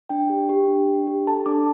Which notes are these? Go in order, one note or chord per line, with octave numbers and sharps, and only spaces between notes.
D4 G5
G4
G4
D4
D4
G4
A4 A5
D4 D6